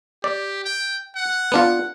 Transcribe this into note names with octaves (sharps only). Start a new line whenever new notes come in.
G4 D5
G5
F#5
B3 D4 F4